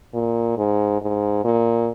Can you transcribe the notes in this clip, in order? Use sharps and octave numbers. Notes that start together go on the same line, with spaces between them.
A#2
G#2
G#2
A#2